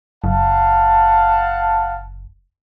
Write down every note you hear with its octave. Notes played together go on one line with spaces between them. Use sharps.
F#1 F5 F#5 A5